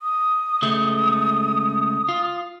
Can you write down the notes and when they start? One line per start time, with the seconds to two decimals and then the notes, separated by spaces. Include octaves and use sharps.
0.02 D#6
0.62 C#2 G#3 A3
2.09 F4